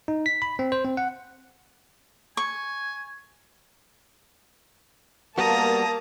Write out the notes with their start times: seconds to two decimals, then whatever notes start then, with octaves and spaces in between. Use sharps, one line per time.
0.08 D#4
0.26 B6
0.42 B5
0.59 C4
0.72 C5
0.85 C4
0.97 F#5
2.37 G#5 C#6
5.38 G3 A#3 B3 F#4 A5 A#5 D#6